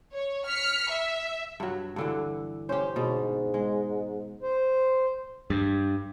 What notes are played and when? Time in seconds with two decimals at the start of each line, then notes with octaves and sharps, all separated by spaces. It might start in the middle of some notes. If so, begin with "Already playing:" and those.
0.13 C#5
0.46 F6 B6 C#7
0.90 E5
1.60 G2 F#3
1.96 G2 D3 E3
2.69 C#4 G4 C5
2.96 G#2 B2
3.54 G#3
4.42 C5
5.50 G2